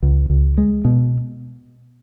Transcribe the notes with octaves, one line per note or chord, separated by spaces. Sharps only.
C#2
C#2
G#3
B2